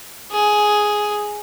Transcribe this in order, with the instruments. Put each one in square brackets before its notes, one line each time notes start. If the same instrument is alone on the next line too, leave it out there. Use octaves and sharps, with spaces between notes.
[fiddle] G#4